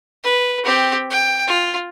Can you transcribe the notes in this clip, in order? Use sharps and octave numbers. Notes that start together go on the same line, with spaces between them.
B4
C4 G4
G5
F4